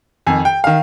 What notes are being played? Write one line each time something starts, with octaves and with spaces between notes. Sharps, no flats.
F2 D#3 G#5
G5
D#3 F5